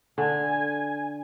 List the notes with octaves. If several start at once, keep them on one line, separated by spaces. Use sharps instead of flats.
D3 G#5